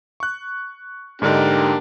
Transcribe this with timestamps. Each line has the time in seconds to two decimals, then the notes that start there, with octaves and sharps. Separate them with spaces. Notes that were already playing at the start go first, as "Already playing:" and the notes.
0.20 C#6 F#6
1.22 G#2 D3 A#3 D4 D#4 G4